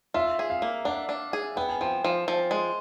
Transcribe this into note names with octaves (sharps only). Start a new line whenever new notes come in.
F4 E5
G#4
F5
A#3
D4 F#5
D4
G#4
B3 G5
G#5
F3 G5
F3
F3
G#3